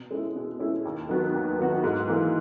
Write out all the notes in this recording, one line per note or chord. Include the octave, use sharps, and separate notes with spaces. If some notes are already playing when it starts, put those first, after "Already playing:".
Already playing: B2
G#3 C#4 E4
B2
G#3 C#4 E4
D#2
D#3 F#3 B3 F#4
D#2
D#3 F#3 B3 F#4
G#2
E3 A#3